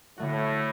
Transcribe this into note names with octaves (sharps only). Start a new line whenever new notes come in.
A2 D3 A3 F#4